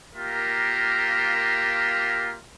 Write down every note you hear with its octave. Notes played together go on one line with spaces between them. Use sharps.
A#3 F4 G4 A#4 E5